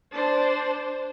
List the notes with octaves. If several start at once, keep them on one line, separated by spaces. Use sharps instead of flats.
D4 C5